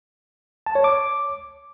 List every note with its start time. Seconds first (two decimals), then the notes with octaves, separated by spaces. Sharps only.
0.66 A5
0.75 C#5
0.84 D6